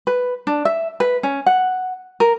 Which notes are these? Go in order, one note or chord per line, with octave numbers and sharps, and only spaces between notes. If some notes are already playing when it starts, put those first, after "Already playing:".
B4
D4
E5
B4
C#4
F#5
A#4